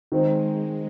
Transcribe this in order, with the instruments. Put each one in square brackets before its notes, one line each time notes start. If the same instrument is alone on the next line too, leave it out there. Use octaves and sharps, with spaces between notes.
[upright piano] D#3 C4 D#4 C5 [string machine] G#3